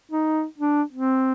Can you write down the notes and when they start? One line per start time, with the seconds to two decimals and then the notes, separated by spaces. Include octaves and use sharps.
0.12 D#4
0.58 D4
0.93 C4